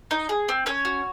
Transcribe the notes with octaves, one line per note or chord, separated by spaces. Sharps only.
D#4
G#4
C4
C#4 C#5
F#4